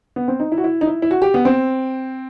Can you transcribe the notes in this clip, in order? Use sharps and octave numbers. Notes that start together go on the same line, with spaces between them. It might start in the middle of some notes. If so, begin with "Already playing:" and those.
B3
C4
D#4
E4
F#4
E4
D#4
E4
E4
F#4
G4
B3
C4